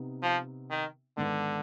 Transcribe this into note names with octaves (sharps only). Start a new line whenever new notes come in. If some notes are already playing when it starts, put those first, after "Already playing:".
Already playing: C3 B3 D#4
F3
D#3
G#2 D3 D#3 B3